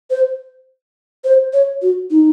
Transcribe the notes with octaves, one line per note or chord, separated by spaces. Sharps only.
C5
C5
C#5
F#4
D#4